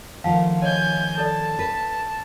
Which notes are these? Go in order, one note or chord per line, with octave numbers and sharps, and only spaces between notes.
D#3 F3 A3 F5 F#5 A5
C#5 D#5 G#5 G6
A4 D5 A5
B4